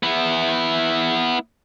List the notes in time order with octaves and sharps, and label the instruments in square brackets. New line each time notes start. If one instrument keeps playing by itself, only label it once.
[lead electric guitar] B3 E4